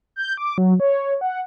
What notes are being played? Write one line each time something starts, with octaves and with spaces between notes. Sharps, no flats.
G6
D6
F#3
C#5
F#5